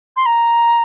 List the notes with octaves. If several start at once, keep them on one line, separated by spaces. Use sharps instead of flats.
C6
A#5